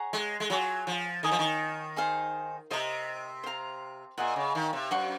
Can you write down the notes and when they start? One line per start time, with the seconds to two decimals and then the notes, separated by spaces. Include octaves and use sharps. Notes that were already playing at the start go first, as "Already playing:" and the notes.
Already playing: G#4 C#5 F#5 A#5
0.13 G#3
0.40 G#3
0.50 F#3 F4 G#4 C#5
0.87 F3
1.23 D#3 A#4 D#5 G#5 D#6
1.31 F3
1.39 D#3
1.96 D#4 G#4 C5 F5
2.71 C3 C5 D#5 A#5 D#6
3.44 C5 F5 A#5
4.18 A#2 G#4 D#5 F#5
4.36 C#3
4.55 D#3
4.73 C3
4.91 F#2 C5 F#5 C#6